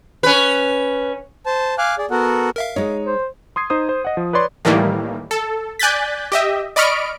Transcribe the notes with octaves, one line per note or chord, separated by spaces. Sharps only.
C#4 B4
C5 A5
F5 G#5 D6 F6 F#6
G#4 D5
B3 F#4 A4 A#4 F#5
A#4 E5 F5
G#3 D#4 C#5
C5
C6 D#6 G#6 C7
D#4 C5 D#6
C5
D#5 F#5
F3
B4 C#5 D5 C6
A2 D#3 E3 G3 A#3
A4
D5 G#5 F#6 G6 A6 B6
G4 D#5 E5
D5 D#5 B5 C#6 F6 D7